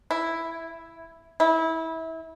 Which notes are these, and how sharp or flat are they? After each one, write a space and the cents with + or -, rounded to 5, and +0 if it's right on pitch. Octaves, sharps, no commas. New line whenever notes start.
E4 +0
E4 -25